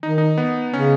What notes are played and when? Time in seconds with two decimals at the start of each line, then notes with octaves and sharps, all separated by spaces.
0.03 D#3 D#4
0.18 D#4
0.38 B3
0.73 C#3 C#4